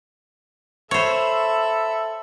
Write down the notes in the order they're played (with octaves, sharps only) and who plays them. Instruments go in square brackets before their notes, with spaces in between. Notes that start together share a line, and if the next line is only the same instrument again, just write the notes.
[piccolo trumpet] A4 [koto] C5 C#5 [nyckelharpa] E5 B5